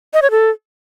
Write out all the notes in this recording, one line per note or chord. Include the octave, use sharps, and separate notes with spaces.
D#5
C#5
A4